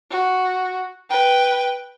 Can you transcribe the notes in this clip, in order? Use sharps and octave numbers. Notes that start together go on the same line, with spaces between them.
F#4
B4 G5